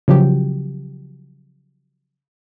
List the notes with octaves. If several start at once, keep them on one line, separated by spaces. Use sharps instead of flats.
C#3 F3 F#3 G4